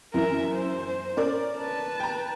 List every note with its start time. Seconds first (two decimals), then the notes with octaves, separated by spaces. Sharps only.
0.14 F#2 E3 A#4 E5
0.54 C5
1.17 C#4 A#4 D5
1.57 B4 A5
2.00 G5 A#5